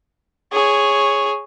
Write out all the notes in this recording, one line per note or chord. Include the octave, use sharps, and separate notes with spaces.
G#4 C#5